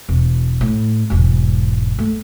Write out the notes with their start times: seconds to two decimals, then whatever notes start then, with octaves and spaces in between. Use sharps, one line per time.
0.09 E1
0.61 A2
1.10 E1 G#2
1.99 A3